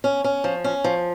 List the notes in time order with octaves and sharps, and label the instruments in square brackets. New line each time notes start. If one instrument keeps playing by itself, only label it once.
[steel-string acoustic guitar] C#4
C#4
F3
C#4
F3